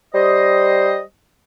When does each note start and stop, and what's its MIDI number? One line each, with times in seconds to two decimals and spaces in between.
0.14 1.00 55
0.14 1.00 72
0.14 1.00 75